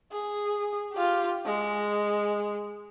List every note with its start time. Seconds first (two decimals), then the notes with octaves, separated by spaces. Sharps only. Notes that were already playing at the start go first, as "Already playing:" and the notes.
0.12 G#4
0.93 F4 G4
1.46 G#3